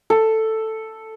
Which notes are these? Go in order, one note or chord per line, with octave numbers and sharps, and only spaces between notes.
A4